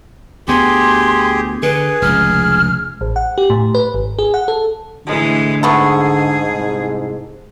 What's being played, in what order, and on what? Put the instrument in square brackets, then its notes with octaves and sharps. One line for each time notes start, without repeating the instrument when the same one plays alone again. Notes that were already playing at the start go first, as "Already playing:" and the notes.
[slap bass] D2 B3 [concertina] G4 G#4 [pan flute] C6
[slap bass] D3 [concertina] G#4 [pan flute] B4
[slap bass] F1 C#2 [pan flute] F6
[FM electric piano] A1
F#5
G4
A2
B4
G#1
G#4
F#5
A4
[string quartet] A2 E3 G#3 [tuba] D3
[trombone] G#2 [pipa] A3 B3 A4 [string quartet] G#4
[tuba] C2